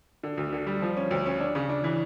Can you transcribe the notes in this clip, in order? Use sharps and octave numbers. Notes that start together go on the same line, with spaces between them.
D3
D2
D3
G3
F3
C#4
D2
C#4
D4
C#3
D4
E3